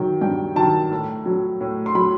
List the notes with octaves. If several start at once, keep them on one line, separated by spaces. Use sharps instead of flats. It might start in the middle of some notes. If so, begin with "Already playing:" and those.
Already playing: D#3 F#3 G5
G2 G5
D#3 F#3 A5
A2
F#3
A2
C6
F#3 B5